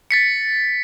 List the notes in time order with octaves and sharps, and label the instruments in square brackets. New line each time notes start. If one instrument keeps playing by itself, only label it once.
[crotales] A6 B6 C#7